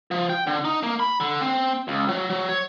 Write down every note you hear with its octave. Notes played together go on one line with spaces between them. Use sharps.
F3
G5
D3
D#4
A#3
B5
D3
C4
C#2
F#3
F#3
C#5